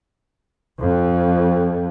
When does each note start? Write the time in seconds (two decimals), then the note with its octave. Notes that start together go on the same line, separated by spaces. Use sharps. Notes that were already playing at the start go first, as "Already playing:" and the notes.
0.81 F2